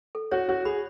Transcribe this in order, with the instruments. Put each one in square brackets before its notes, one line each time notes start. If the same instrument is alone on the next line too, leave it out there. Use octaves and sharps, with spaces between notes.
[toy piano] A4
[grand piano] F#4 [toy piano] C#5
[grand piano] F#4 [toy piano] C#5
[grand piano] G#4 [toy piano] B5